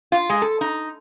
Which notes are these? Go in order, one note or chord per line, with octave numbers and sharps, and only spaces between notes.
F4
G#3
A4
D#4